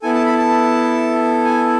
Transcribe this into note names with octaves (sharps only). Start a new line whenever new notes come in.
B3 E4 A4 G#5
A5
B5
A5
G#5